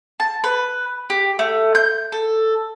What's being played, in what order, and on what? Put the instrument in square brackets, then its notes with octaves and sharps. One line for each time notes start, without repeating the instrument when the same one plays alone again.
[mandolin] A5
B4
G4
A3
G6
A4